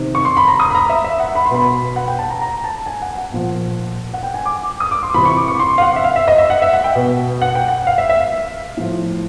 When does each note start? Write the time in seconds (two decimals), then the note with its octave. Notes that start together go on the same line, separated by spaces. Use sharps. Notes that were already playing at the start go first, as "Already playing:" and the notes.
Already playing: C3 D#3
0.15 C#6
0.25 C6
0.37 B5
0.48 A#5
0.60 D#6
0.71 B5
0.75 A#5
0.90 E5
1.04 E5
1.20 F#5
1.35 B5
1.46 C6
1.51 B2 B5
1.96 F#5
2.08 G5
2.19 A5
2.30 A#5
2.42 A#5
2.64 A5
2.86 G#5
3.02 F#5
3.17 F#5
3.32 A#2 F3
4.14 F#5
4.23 G5
4.34 G#5
4.45 D6
4.80 D#6
4.91 D6
5.03 C6
5.14 C3 E3 B5
5.25 C#6
5.37 D6
5.48 C#6
5.60 C6
5.78 F5
5.82 F#5
5.96 E5
6.04 F5
6.16 E5
6.28 D#5
6.38 E5
6.50 F#5
6.62 E5
6.73 F#5
6.84 G5
6.95 B2
7.42 F#5
7.55 G5
7.68 F#5
7.87 F5
7.98 E5
8.10 E5
8.20 F5
8.77 A2 F3